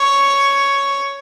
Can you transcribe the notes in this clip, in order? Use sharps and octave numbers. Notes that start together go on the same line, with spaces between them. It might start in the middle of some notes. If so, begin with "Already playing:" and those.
Already playing: C#5